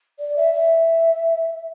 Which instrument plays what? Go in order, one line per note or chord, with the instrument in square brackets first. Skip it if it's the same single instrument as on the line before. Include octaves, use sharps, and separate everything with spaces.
[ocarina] D5
E5
E5